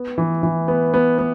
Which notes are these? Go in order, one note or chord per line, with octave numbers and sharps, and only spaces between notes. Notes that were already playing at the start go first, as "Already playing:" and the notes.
Already playing: B3
E3
E3
B3
B3
B3